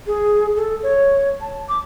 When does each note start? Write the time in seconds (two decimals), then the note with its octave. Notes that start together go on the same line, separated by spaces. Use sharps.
0.07 G#4
0.56 A4
0.83 C#5
1.41 A5
1.69 D6